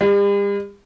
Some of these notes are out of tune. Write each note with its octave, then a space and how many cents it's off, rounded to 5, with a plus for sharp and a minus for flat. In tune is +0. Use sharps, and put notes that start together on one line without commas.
G3 +45